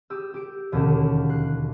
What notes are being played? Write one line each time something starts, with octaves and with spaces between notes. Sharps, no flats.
G4 D#6 E6
G4 D7
E1 D#2 D3 C#4 E7
F#6 C7